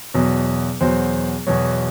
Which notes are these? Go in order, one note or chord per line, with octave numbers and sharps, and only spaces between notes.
E2 B2 F#3
E2 B2 F#3 C5
E2 B2 F#3 C#5